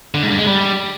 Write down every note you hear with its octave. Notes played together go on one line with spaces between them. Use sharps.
D3
G#2
G2
G#3
G3